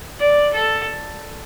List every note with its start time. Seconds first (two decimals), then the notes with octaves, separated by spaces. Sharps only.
0.19 D5
0.53 A4